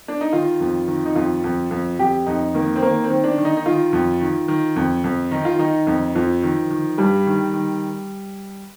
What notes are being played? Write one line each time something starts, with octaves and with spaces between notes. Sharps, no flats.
D4
D#4
D#3 F4
F2
D#3
D#4
F2 F4
F2
F2
F2 G4
F2 D#4
D#3 A#3
C4
D#3 A#3
C4
D#3
D4
D#3
D#4
D#4
D#3 F4
F2
D#3
D#3
F2
F2
D#3 D#4
F4
D#3 D#4
F2
F2 F3
D#3
D#3
G2 G3
D#3
D#3